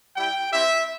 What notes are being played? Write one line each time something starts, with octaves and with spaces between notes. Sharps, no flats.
G3 E4 G4 G5
C4 E4 G4 E5